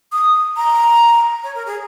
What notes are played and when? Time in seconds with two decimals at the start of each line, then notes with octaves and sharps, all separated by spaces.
0.13 D#6
0.57 A#5
1.44 C#5
1.55 A#4
1.66 G#4